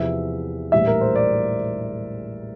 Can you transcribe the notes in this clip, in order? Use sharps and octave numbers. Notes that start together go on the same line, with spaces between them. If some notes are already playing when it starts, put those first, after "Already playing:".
Already playing: E2 C3 F3 E5
A#1 A2 E3 G3 E5
A#4
C5
D5